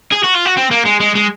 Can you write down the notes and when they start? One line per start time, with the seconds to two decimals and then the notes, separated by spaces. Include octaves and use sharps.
0.13 G#4
0.24 F#4
0.35 F4
0.46 F#4
0.57 C4
0.71 A#3
0.85 G#3
1.00 G#3
1.15 G#3